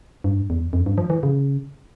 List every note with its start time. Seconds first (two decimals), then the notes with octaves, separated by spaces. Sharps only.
0.24 G2
0.50 E2
0.73 F2
0.86 G2
0.98 F3
1.10 E3
1.23 C#3